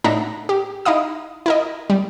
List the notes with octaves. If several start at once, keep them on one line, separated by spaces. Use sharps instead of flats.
A2 D4 D#4 E5 F#5 A#5
G4
D#4 E4 F5 D#6
E4 A#4 D#5
G3